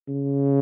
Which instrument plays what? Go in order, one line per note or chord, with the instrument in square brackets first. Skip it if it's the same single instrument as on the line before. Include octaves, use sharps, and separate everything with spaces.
[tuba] C#3